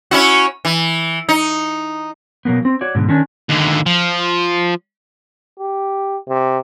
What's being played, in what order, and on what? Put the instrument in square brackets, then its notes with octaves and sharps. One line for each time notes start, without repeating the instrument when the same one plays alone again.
[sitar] C#4 E4 F#4
E3
D#4
[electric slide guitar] B2 F#3 A#3 B3
C4
F#4 C#5 D5
G#2 B2 D3
D#3 C#4 D4
[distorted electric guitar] D#2 D3
F3
[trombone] G4
C3